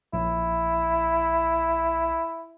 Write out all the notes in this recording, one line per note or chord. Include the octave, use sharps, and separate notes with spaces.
A#1 E4